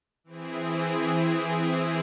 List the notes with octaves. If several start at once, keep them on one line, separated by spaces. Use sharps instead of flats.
E3 C4 E4 G#4